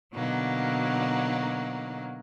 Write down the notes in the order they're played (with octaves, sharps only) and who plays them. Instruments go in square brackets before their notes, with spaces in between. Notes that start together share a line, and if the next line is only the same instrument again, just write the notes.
[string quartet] B2 D3 F#3 A#3 D#4